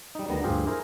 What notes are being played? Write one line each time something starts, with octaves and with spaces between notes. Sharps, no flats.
G3 D#4
D2 D#3 G3 B3 A#5
D2 G2 F3 F4 G4 G#4
E4 G#4 A#4 C5